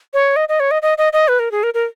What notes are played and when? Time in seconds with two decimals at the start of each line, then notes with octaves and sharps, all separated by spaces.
0.14 C#5
0.36 D#5
0.49 D#5
0.60 C#5
0.71 D#5
0.82 D#5
0.98 D#5
1.13 D#5
1.28 B4
1.39 A#4
1.52 G#4
1.63 A#4
1.74 A#4